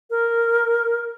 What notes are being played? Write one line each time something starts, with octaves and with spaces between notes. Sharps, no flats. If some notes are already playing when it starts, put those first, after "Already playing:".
A#4